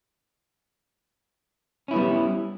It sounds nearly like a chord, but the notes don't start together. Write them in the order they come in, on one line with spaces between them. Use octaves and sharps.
C#4 E4 B3 G3